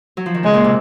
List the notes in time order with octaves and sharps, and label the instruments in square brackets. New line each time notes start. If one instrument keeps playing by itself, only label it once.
[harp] F#3
F3
D#3
[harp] C#3 [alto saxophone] G#3
[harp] A#2
C3